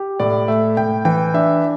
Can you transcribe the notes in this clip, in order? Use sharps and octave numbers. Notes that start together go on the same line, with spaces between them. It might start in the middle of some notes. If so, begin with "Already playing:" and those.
Already playing: G4
A2 D5
A3 E5
A2 G5
E3 G5
D4 E5